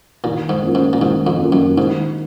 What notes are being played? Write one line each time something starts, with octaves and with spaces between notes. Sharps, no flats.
A#2 D#3
G#2
A#3 C#4 F4
G#2
A#2
G#2 D#3
F2
A#3 C#4 F4
F#2
G#2 D#3